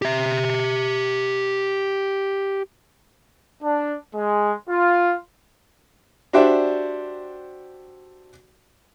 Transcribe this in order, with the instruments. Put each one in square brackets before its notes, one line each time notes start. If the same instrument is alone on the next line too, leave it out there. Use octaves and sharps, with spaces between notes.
[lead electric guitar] G4 E5
[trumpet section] D4
G#3
F4
[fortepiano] D4 F#4 G4 C5 D5 E5